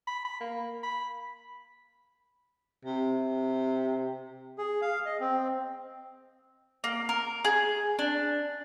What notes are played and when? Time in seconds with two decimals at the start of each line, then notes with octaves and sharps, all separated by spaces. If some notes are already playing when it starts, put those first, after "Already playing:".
0.07 B5
0.25 B5
0.41 A#3
0.83 B5
2.85 C3
4.58 G#4
4.82 F5
5.05 D#5
5.20 C4
6.84 A#3
7.09 A#4
7.45 G#4
7.99 D4